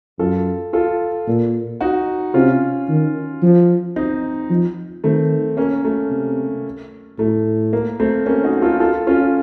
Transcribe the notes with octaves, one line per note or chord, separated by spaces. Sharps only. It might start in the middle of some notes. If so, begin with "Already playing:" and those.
F#2 F4 A4
F4 A4
A#2
D#4 F#4
C3 C#4 F4
D#3
F3
C4 D#4
F3
D#3 A3 C4
A#3 C#4
A3
C3
A2 A3
A#3
A3 C4
A#3 C#4
D#4 F#4
F4 A4
F4 A4
C#4 F4